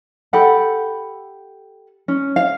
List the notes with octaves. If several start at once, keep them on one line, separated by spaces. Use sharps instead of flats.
G4 A4 F#5 B5
C#4
F5